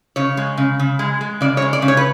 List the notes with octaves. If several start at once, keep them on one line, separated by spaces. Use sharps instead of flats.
C#3 C#5
G#3
C#3
C#3
G#3
G#3
C#3 D5
C#5
G#3
D5
C#3
C#5
B4